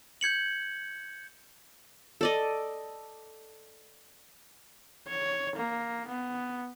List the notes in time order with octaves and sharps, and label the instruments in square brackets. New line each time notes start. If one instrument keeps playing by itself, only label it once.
[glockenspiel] G6 G#6 C#7 F#7
[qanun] A4 D5 D#5
[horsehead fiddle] C#5
A#3
B3